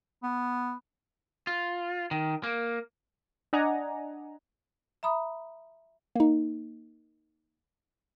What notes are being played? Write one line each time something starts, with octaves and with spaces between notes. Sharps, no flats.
B3
F4
D#3
A#3
D4 D5 D#5 F#5 G#5 A#5
E5 A#5 B5 D#6
A#3 D#4